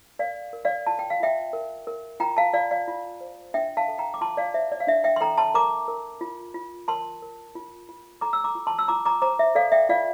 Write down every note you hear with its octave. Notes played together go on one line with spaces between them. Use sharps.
A#4 D5 F5
A#4
D5 F5
F4 A5
G5
F5
F4 E5 G5
A#4
A#4
F4 G5 A#5
F5 A5
F4 D5 F5
D5 F5
F4
C5
D4 E5 G5
F5 A5
A4
G5 A#5
D6
F4 A5 C6
D5 F5
C5 E5
D5
F5
D4 E5
E5 G5
C6
A4 G5 A#5
A5 C6
A#4 A#5 D6
A#4
F4
F4
A#4 A5 C6
A#4
F4
F4
A4 A#5 D6
E6
A#5 D6
F4
A5 C6
E6
F4 A#5 D6
A#5 D6
C5 A#5 D6
E5
A4 D5 F5
E5 G5
F4 D5 F5